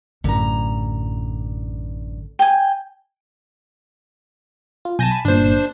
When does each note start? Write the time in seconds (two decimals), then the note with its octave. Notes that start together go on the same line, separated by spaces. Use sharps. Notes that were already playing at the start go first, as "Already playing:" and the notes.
0.24 A1 F#2 D3 A#5
2.39 G5 G#5
4.85 F4
4.99 B1 G#5 A5 G6 A#6
5.11 B5
5.25 G1 A#2 D4 C5